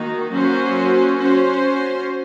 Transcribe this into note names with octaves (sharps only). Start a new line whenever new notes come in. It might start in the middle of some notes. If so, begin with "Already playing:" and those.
Already playing: D#3 A#3 D#4 F#4
F#3 A#3 C#4 F#4 C5
C#4 F#4 C5